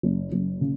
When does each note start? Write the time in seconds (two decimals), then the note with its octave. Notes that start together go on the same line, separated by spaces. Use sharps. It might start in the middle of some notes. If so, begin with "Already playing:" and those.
0.03 F#1
0.32 F#1
0.61 C#3